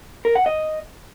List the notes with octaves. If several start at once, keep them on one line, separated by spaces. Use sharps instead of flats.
A#4
F#5
D#5